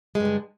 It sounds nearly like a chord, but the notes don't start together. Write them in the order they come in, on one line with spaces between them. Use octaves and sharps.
G#3 G2 D3